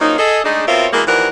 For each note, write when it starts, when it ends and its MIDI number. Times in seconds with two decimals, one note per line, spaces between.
0.01 0.17 53
0.01 0.17 54
0.01 0.17 58
0.01 0.17 61
0.01 0.17 63
0.19 0.39 68
0.19 0.39 69
0.19 0.39 75
0.44 0.63 56
0.44 0.63 57
0.44 0.63 62
0.44 0.63 63
0.44 0.63 68
0.66 0.86 47
0.66 0.86 60
0.66 0.86 65
0.66 0.86 70
0.66 0.86 73
0.66 0.86 76
0.92 1.02 47
0.92 1.02 52
0.92 1.02 56
0.92 1.02 58
1.06 1.29 39
1.06 1.29 52
1.06 1.29 53
1.06 1.29 70
1.06 1.29 74
1.06 1.29 78